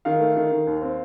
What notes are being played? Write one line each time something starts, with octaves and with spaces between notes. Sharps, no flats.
D#3 F5
A3
D#3
D#3
D#2
C4